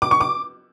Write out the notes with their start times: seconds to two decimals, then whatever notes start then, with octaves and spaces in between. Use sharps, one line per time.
0.02 D6
0.11 C#6
0.21 D6